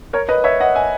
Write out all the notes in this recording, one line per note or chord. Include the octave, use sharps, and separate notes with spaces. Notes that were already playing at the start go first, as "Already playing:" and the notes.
A#4 C#5
B4 D#5
C#5 E5
D#5 F#5
E5 G#5